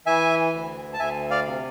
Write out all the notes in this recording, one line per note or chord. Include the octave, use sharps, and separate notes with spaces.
E3 E5 G#5
D2
A5
D2 E5 G#5
D5 F5
C3